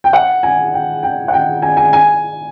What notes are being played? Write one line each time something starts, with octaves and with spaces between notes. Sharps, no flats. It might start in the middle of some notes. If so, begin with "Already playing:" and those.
G5
F#5
G#5
G5
G5
F#5
G5
G#5
G#5
G#5